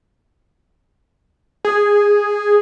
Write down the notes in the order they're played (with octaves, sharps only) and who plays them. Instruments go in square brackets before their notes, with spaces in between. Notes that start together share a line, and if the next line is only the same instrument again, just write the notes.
[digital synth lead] G#4